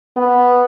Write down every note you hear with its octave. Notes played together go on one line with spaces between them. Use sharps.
B3